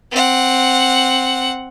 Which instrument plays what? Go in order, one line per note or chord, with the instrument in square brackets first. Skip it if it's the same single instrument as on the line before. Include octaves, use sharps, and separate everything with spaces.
[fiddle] C4 F#5